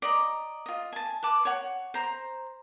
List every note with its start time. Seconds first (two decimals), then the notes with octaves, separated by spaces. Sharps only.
0.02 D5 D#5 A#5
0.66 F4 D#5
0.93 G#5 A5
1.23 B4 A5 D6
1.45 C#5 F#5
1.94 C5 A#5